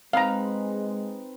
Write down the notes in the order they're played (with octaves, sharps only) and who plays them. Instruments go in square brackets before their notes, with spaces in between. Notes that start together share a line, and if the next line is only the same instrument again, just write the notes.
[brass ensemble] G#3 [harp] C4 D#4 B4 [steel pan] F5 A#5